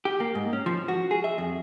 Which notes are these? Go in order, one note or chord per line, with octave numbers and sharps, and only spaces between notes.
G4
A#3
G#2
C#4
F3
F#4
G#4
E5
F2